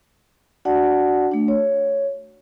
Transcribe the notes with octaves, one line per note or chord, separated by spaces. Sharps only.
D4 F#4 D5 F#5 A5
A3 D4
C#5